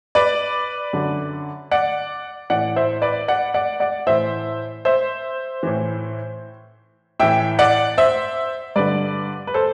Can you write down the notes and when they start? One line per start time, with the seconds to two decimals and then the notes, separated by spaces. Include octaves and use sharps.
0.15 B4 D5
0.93 F#2 D3
1.72 D5 F#5
2.50 A2 E3 D5 F#5
2.76 C5 E5
3.02 B4 D5
3.28 D5 F#5
3.54 D5 F#5
3.80 D5 F#5
4.06 A2 E3 C5 E5
4.85 C5 E5
5.63 A2 E3
7.19 A2 E3 E5 G5
7.59 D5 F#5
7.98 C5 E5
8.76 G2 D3 B4 D5
9.47 B4
9.54 A4 C5